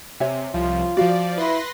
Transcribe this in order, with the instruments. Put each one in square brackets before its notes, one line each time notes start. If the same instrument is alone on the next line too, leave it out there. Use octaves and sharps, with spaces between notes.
[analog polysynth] C3 [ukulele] C#5 E5 G#5
[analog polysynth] C2 F3 [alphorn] F4
[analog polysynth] F3 D5 [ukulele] F#4 F5
[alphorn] E4 [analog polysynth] B4 C6 A#6